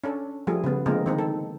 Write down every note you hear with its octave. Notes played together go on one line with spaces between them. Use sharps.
C#4 D4 A4
F3 G3 A3 G#4
C#3 B3
D3 F3 G#3 A#3 C4 A#4
D#3 C4 D#4
A4